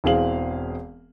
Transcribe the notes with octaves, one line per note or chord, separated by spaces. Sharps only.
E1 E3 C4 G#4 F5 F#7